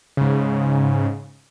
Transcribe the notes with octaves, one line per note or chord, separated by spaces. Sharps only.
G#2 C#3